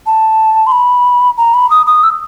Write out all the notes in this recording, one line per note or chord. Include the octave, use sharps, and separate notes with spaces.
A5
C6
B5
A#5
B5
D#6
D#6
E6